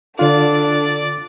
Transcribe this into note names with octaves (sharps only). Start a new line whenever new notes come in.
D3 D4 F4 A4 D5